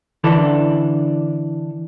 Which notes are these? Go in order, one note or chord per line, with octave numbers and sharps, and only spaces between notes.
D3 E3 D4 A4